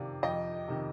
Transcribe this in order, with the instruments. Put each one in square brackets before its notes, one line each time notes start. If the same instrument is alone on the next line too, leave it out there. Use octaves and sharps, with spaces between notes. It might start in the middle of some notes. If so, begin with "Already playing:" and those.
Already playing: [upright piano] F2 C3 D#3 D5 F5
F2 D#5 G5
C3 D#3